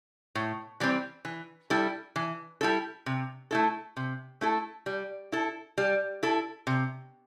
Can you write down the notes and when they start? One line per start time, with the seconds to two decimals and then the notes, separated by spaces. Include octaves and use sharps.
0.35 A2
0.80 E3 G3 C4
1.25 E3
1.70 G3 E4 A4
2.16 E3
2.61 G3 E4 A4
3.06 C3
3.51 A3 E4 A4
3.97 C3
4.41 A3 E4 A4
4.86 G3
5.32 E4 A4
5.78 G3
6.23 E4 A4
6.67 C3